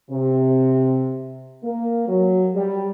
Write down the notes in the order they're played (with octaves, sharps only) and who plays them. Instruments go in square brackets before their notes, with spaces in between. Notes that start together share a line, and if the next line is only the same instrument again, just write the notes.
[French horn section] C3
A#3
F#3
G3